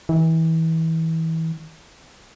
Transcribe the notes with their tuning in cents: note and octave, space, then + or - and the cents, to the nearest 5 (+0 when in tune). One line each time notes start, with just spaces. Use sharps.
E3 -30